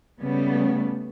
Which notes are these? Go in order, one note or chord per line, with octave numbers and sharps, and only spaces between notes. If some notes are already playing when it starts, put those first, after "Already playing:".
C#3 G3 A3 B3